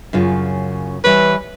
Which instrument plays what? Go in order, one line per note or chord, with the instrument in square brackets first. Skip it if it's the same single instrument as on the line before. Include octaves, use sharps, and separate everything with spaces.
[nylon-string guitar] F#2 C#3 F4
[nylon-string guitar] E3 G3 C#5 [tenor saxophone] B4